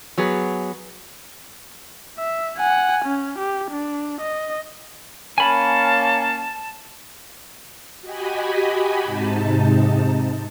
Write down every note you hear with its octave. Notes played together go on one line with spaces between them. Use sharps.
F#3 B3 G#4
E5
F#5 G#5
C#4
G4
D4
D#5
A#3 C#4 G#5 A5 B5
F#4 G4 D#5 G#5 B5
G#2 C3 D#4 A5